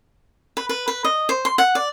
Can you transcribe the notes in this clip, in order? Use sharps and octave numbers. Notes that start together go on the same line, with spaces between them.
B4
B4
B4
D#5
C5
C6
F#5
D5